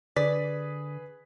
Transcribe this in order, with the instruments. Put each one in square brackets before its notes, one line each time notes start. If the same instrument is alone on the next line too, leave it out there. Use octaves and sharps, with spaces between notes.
[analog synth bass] D3 [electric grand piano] G#4 B4 B6 [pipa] D5